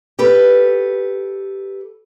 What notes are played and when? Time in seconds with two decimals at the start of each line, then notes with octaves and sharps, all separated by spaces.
0.19 G4 A4 B4